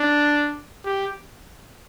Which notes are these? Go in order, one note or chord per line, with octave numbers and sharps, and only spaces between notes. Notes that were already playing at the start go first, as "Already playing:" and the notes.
Already playing: D4
G4